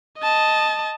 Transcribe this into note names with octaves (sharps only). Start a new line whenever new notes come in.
D#5 A5